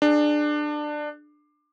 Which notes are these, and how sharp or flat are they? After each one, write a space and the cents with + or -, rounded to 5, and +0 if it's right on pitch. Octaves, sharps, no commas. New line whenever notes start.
D4 +20 G#4 +0